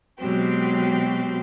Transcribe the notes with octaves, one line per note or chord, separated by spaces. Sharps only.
B2 F#3 G#3 C4 G4